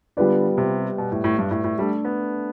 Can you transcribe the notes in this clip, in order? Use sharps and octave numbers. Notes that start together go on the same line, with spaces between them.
D3 G3 B3 F4 B4 D5
C3
B2
A2
A2
G2
A2
A2
G3 A3 D4 A4
B3